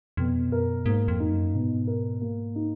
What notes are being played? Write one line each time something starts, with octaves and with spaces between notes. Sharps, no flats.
F2 B2
F#2 A#4
G#2 A#3
F2
D#4
F#2
G#2 B2
A#4
A#3
D#4